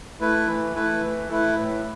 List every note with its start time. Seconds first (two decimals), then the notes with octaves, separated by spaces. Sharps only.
0.20 A3 E4 B4
0.48 E3
0.75 A3 E4 B4
1.02 E3
1.28 A3 E4 B4
1.56 A2